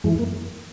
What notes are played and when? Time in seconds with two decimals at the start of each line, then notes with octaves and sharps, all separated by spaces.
0.04 F#2 E3 G#3
0.19 A#3